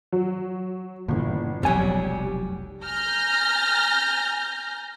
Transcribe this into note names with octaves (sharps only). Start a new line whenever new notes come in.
F#3
G1 A#2 C#3 E3
F1 B1 F2 F#3 G3 G#5
G#5 A#5 F6 G6 A#6